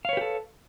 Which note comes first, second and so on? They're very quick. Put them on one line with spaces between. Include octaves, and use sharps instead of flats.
F5 C#5 B4 G4 A4